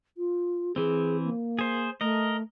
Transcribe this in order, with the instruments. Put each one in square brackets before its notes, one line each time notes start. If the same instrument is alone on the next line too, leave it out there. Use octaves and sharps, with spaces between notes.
[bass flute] F4
[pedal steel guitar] E3 C4 [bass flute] G#4
[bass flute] A#3
[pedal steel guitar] G#4 C5
[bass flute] A3 [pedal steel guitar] A#4 D#5